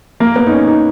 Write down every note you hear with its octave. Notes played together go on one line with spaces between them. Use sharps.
A#3
B3
D#4
C#4
D#4